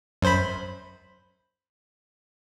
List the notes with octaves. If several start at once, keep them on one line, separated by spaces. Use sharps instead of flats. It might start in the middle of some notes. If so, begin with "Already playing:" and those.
F#2 C5 B5